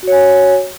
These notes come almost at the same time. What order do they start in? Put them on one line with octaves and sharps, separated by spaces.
F#4 C#5 G#5